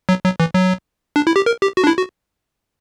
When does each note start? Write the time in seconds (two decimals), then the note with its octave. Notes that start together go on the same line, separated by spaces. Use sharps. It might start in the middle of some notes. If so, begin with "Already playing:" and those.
0.09 F#3
0.25 F#3
0.40 E3
0.54 F#3
1.16 D4
1.27 E4
1.36 G4
1.46 A#4
1.62 G4
1.77 F#4
1.84 D4
1.87 E4
1.97 F#4